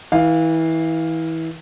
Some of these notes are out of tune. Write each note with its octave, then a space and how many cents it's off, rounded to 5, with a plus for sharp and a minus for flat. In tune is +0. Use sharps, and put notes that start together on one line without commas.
E3 -25 F5 +0